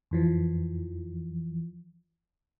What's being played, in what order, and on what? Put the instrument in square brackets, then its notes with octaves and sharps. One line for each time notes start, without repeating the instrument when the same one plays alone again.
[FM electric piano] F2 E3 F3